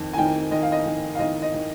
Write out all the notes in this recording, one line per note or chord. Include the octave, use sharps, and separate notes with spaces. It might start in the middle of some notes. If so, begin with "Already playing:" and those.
Already playing: F2 D#3
G#5
D#3 G5
D#3 D#5
F5
D#5
D#3
F5
D#3 D#5
D#5
D#3